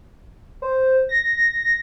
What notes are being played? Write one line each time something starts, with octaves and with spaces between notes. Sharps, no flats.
C5
A#6